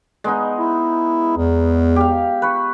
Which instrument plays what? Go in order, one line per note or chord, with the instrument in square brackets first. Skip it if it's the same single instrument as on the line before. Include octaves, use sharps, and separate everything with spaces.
[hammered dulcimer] G#3 B3 D#4
[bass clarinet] E4
E2
[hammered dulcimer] G4 F5
B4 C#6